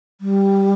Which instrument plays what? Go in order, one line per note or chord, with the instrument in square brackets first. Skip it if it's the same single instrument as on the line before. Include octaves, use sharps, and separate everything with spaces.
[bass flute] G3